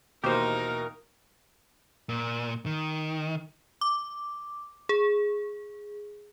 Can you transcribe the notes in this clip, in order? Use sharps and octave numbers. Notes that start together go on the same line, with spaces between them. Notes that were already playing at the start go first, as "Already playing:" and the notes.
D#2 B2 E3 A#3 D#4 G4 A#4 C5
A#2
D#3
D6
G#4